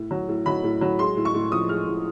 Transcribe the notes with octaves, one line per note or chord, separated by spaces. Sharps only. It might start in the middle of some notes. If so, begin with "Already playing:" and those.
Already playing: A2
F#3
A2
F#3 B5
A2
F#3
G#3 C6
A2
C#6
A2
F3 D#6
G#3 F6
A2